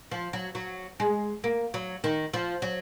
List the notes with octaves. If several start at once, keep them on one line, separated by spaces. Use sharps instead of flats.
F3
F#3
F#3
G#3
A#3
F#3
D#3
F3
F#3